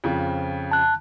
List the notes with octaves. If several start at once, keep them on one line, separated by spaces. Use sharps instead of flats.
F2 C#3 F3
A5 F#6